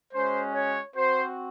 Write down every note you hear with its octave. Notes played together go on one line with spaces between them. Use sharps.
G#3 C#4 F#4 C5
C#5
C4 F#4 C5